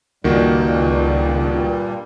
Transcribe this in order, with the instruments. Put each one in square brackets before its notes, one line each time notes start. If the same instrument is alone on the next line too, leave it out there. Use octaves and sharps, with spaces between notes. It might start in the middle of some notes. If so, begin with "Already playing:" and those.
[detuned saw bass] C#2 [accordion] G2 A#2 G3 [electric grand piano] D#3 A#3 F#4